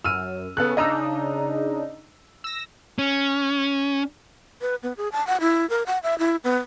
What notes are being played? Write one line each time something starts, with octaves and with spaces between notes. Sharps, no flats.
F#2 E6 F6 D#7
C#3 B3 A4 F#6
C#3 D4 D#4 D#5 A#5 E6
E6 A#6
C#4
B4
B3
G#4
A5
F#5
E4
A#4
F#5
E5
E4
B3